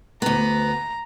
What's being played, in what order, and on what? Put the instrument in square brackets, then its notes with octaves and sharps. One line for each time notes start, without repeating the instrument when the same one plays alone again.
[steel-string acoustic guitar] D2 B3 [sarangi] A#5